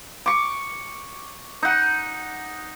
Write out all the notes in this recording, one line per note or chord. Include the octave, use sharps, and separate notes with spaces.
C#6 D6
D#4 F#5